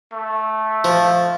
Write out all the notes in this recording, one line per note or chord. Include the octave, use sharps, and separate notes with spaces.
A3
F3